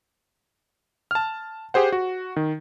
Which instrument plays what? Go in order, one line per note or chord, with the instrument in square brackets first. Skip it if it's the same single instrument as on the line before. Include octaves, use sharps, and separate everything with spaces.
[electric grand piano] A5 F6
G4 G#4 C5 F#5
F#4
D#3